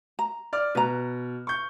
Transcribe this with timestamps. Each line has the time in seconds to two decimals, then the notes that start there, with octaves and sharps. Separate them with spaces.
0.19 A#5
0.53 D5 F6
0.75 B2 B4 A#5
1.47 C#6 G6